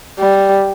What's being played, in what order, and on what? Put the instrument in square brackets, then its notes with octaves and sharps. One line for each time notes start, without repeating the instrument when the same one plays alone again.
[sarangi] G3